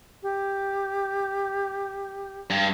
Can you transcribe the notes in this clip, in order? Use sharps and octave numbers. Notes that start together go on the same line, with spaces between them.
G4
G2